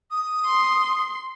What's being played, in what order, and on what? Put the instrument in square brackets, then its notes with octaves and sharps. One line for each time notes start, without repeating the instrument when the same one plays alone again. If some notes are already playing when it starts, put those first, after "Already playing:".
[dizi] D#6
[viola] C6